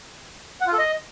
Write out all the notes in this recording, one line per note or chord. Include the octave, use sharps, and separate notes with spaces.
F#5
F4
A4
D#5